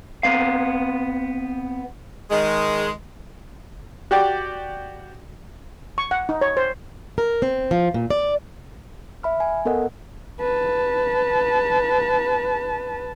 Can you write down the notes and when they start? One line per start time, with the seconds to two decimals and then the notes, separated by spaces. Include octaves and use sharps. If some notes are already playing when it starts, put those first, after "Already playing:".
0.23 B3 C4 F5
2.31 D#3 G#3
4.11 F#4 G4 D5 G5
5.98 C#6
6.11 F#5
6.29 D#4
6.41 C#5
6.57 C5
7.18 A#4
7.42 C4
7.71 F3
7.94 A#2
8.10 D5
9.23 E5 B5 F6
9.40 G#5
9.65 B3 A4 A#4 D#5 F#5
10.40 B4 A5